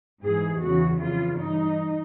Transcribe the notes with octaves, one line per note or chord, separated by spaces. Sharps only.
G#2 E3 G#4
E2 C#3 E3 F#4
F2 C#3 E3 F4
G2 E3 D#4